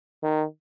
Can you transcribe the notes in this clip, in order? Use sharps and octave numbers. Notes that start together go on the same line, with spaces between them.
D#3